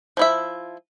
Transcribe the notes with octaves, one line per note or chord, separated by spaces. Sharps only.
F3 E4 E5